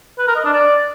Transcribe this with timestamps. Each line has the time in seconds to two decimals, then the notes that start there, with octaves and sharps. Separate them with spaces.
0.19 B4
0.27 A#4
0.36 D#5
0.45 D4
0.53 D5